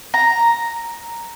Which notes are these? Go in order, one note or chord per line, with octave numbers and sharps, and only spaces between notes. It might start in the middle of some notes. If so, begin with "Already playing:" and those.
A#5